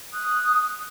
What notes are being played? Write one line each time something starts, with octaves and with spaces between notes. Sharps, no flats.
D#6 F#6